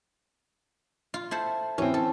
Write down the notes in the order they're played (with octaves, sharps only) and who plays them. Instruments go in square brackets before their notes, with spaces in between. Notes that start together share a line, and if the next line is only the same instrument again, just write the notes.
[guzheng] F4
E4 A4 C5
[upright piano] E3 C4 [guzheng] C#4
[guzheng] A4